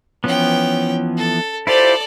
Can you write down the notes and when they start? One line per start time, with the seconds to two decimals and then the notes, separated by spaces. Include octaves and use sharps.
0.24 E3 F3 B3 C#4 G5
1.17 A4
1.67 E4 F4 G4 A4 C5 D5